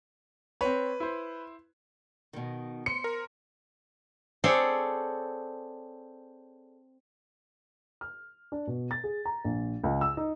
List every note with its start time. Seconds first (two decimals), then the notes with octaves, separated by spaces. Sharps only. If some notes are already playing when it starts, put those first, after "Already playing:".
0.61 C4 B4 C#5
1.00 E4 C5
2.33 B2 D#3
2.86 C5 C#7
3.04 A#4
4.44 C4 G#4 A4 C#5 D5
8.01 F6
8.52 D4
8.67 B2
8.91 A6
9.04 G#4
9.25 A#5
9.44 A#1
9.83 C#2
10.01 E6
10.17 D#4